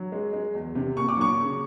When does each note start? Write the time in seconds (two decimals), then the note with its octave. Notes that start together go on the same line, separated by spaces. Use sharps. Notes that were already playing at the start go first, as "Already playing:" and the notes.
Already playing: F#3
0.12 G#3
0.33 G#3
0.55 E2
0.75 C3
0.96 A#2 C#6
1.09 D6
1.17 F#3 C#6
1.39 C#3